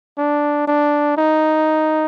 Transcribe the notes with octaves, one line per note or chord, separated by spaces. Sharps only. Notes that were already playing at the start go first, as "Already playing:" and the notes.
D4
D4
D#4